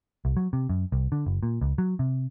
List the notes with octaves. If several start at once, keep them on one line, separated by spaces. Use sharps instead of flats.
C2
F#3
C3
F#2
C2
D3
F#1
A#2
C#2
F#3
C3